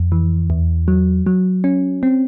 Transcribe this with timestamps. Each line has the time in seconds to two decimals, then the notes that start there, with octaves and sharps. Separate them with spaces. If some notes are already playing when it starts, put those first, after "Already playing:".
Already playing: F2
0.12 E3
0.50 E2
0.88 F#3
1.26 F#3
1.64 C#4
2.03 C4